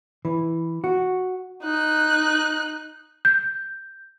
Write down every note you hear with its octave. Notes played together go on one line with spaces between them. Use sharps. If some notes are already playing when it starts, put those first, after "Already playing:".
E3
F#4
D#4 F#6
G6